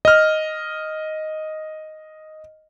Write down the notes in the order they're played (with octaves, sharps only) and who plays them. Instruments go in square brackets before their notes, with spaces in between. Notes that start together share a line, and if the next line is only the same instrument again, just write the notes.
[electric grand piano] D#5 F6